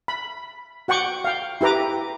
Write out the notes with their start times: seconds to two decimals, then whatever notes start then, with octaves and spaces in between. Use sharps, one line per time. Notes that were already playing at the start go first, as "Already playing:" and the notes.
0.08 B5
0.88 F#4 F#5 G5 C#6 D6
1.24 F5 G5
1.61 E4 G4 B4 A#5 D6